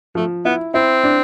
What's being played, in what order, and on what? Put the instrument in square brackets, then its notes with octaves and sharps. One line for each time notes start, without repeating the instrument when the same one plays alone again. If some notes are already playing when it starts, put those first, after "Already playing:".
[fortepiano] F3 [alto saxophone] A3
[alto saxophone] B3 [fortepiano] E4
[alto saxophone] C4 [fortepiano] E4
[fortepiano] D4